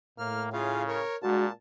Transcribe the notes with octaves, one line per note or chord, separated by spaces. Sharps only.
A2 A#3 F6
C#3 F4 G#4 F5
A#4 C#5
A#2 G#3 D4 F#4 A5